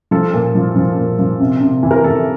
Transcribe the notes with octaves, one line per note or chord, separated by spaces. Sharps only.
F3 A4
A#2
F3
F3
A#2
F3
C3
C3
E3
A#4
E3 A4